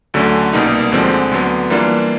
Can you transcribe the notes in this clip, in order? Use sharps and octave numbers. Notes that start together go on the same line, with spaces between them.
D2 D3 F#3 A3 C#4
C2 B2 G3 A#3 D#4
D2 D3 F3 G#3 C4
D2 D3 F#3 B3
E3 G3 A#3 D4 F4